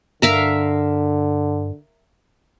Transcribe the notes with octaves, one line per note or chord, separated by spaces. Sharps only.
G2 D3 A#4 E5 F5